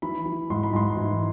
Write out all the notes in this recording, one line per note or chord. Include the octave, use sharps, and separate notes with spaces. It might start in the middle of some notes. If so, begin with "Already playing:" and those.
E3 B5
E3
G#2 C6
B5
G#2 C6
E3